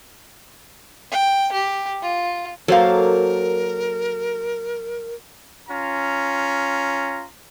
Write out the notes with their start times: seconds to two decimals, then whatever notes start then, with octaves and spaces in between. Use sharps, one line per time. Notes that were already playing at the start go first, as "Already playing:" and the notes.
1.11 G5
1.52 G4
2.02 F4
2.68 F#3 A#3 A4 A#4 C5 F5
5.69 C#4 F4 A#5